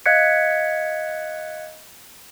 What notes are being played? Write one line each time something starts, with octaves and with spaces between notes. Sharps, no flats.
D#5 F5 F#6 G#6 B6 C#7